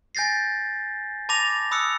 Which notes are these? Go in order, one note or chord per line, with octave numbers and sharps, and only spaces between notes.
G#5 G6 A6 A#6 C7
A5 B5 D6 A6 A#6 F7
B5 D#6 E6 F#6 C#7